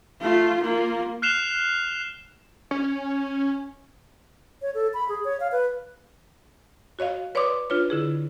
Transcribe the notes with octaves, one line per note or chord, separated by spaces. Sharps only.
A3 F4
A#3 F4
F6 F#6 C7 E7 F7 G7
C#4
C#5
A4
B5
G#4
C#5
F5
B4
F#4 C#5 D#5 F5
B4 C#5 D5 C6 D6 D#6
D4 F4 B4 C#5
D3 E4 G#4